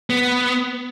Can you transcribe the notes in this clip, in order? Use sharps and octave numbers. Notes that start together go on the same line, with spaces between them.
B3